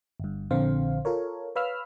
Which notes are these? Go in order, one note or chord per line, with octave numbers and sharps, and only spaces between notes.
G1 G2
A#1 D3 C4 C5 F5
F4 A4 A#4 C#5
B4 C#5 F5 B5 E6 F6